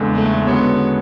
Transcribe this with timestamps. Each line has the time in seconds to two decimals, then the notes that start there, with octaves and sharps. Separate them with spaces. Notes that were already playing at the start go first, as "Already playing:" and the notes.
Already playing: E2 C#3 G#3 D4 A4
0.14 A3
0.46 D3 G#3 B3 C#4 F#4 C#5